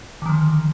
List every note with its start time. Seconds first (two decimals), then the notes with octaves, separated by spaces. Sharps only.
0.22 D3
0.26 D#3
0.29 F3